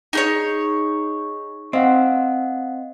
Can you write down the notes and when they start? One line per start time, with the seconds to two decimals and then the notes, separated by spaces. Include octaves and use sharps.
0.13 D#4 G#4 C#5
1.73 C4 D#5 F5 F#5